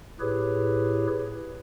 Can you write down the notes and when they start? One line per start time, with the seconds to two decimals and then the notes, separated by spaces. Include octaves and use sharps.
0.20 A2 E4 G4 G#4 B4 C#5